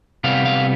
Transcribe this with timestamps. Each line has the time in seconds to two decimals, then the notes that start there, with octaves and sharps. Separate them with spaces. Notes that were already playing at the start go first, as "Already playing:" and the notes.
0.24 C3 G3 B3 F5
0.45 F5